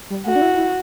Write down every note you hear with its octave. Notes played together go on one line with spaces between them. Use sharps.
G3
A3 F#4
D4
E4
E4